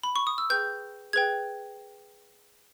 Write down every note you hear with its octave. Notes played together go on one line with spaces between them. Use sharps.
B5
C#6
D#6
E6
G#4 B4 G5 G6
G#4 B4 G5 G#6